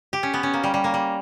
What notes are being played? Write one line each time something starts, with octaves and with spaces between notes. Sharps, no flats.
G4
C#4
B3
C#4
A#3
G3
G3
A#3
G3